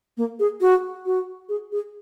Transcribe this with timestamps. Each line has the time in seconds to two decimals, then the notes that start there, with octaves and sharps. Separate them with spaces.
0.17 A#3
0.40 G#4
0.61 F#4
1.06 F#4
1.49 G#4
1.72 G#4